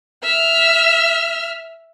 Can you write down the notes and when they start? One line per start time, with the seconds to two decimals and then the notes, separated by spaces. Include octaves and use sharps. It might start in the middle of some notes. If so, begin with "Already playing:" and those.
0.23 E5 F6